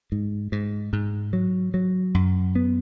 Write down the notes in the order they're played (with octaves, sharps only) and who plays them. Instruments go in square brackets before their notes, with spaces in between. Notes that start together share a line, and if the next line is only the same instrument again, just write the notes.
[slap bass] G#2
G#2
G#2
F#3
F#3
F#2
B3